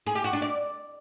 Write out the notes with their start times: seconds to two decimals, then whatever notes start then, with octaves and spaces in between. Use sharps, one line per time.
0.06 G#4
0.15 G4
0.24 F#4
0.33 D4
0.42 D5